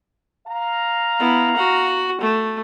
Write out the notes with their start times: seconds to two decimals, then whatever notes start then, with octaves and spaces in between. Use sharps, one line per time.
0.47 F5 A#5
1.20 B3 E4
1.56 F#4 F#5
2.21 A3